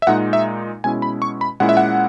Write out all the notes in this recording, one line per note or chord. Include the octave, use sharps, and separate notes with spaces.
E5
A#2 G#3 D#4 F#5
E5
B2 G#3 C#4 E4 G#5
B5
C#6
B5
A#2 G#3 C#4 E4 F#5
E5
F#5